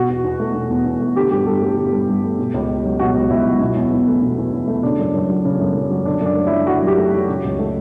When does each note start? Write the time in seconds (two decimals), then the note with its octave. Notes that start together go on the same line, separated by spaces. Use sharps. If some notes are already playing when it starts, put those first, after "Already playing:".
Already playing: B2 F#4
0.09 E2
0.24 E2
0.40 A3
0.55 B2
0.70 E2
0.85 E2
1.00 A3
1.16 D3 G4
1.31 G2 G4
1.46 G2 A4
1.62 A3 G4
1.77 D3
1.92 G2
2.08 G2
2.23 A3
2.39 B2
2.54 C#2
2.69 C#2
2.85 F#3
2.99 B2 F#4
3.15 C#2
3.30 C#2 E4
3.45 F#3
3.60 B2
3.76 E2
3.92 E2
4.07 A3
4.22 B2
4.38 E2
4.53 E2
4.68 A3
4.83 C#3 D4
4.99 F#2
5.14 F#2
5.29 F#3
5.45 C#3
5.60 F#2
5.75 F#2
5.90 F#3
6.05 D3 D4
6.21 F#2 D4
6.37 A3
6.47 F#3 E4
6.67 D3 F#4
6.83 F#2 G4
6.98 A3
7.14 F#3
7.29 C#3
7.44 C#2
7.59 A3